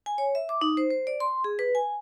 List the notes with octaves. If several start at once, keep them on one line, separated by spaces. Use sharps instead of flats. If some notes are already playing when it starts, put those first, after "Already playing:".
G#5
C#5
E5
D6
D#4
C5
C5
D5
C6
G#4
B4
G#5